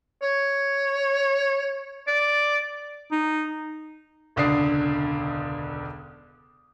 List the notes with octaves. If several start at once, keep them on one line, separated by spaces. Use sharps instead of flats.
C#5
D5
D#4
E1 C#2 D3 D4 D#6 C7